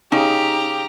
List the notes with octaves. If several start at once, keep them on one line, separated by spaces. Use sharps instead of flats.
C#3 D#4 G4 A#5